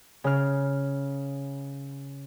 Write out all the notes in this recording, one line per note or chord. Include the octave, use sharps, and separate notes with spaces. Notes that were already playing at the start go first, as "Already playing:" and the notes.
C#3 F6